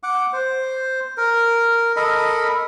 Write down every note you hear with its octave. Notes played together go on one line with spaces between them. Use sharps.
F#5 D6
C5
A#4
A4 A#4 D#5 B5